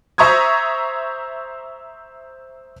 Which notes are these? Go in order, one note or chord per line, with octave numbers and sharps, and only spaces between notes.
C5 E5 A#5 C#6 D#6 G#6